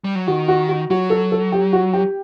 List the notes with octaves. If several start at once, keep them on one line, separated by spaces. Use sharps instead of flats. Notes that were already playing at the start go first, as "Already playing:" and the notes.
G3
F#3
D#3 F#4
F#4
F#4
F#3 F#4
A4
A4
G4
F#4
G4